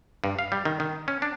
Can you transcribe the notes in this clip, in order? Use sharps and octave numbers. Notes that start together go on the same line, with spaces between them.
G2
F5
G3
D#3
D#3
C#4
D4